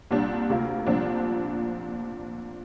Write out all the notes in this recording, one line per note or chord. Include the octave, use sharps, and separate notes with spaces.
C2 A#2 G3 D4
D2 C3 A#3 F4
C2 A#2 F3 D4